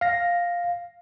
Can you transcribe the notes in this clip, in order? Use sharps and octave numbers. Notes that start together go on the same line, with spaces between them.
F5 A#6